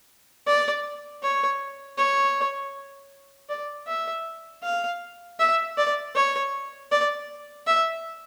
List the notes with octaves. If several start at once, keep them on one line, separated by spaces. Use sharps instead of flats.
D5
C#5
C#5
D5
E5
F5
E5
D5
C#5
D5
E5